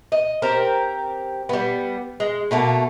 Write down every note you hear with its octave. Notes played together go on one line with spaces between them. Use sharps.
D#5
C4 G4 A#4
G3 B3
G#3
B2 A3 A#3